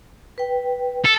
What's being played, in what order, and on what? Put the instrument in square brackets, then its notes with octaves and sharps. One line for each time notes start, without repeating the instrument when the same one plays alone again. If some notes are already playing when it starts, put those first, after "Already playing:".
[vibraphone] B4 G5
[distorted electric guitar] A4